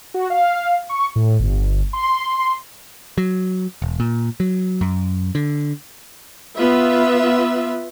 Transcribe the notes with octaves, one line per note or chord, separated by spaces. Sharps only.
F#4
F5
C#6
A2
G1
C6
F#3
E1
A#2
F#3
F#2
D3
B3 F4 B4 E5